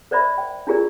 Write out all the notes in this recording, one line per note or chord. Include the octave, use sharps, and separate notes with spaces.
A#4 C5 D5 E5 B5
G5
D4 E4 F4 G#4 A#4 D5